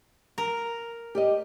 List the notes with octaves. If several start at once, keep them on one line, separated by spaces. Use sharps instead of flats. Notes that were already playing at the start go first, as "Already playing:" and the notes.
A#4
G4 D5 D#5